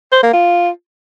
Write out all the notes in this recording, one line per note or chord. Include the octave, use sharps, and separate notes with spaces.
C5
A#3
F4